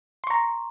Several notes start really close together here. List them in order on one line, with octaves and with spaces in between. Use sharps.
C6 C#6 A#5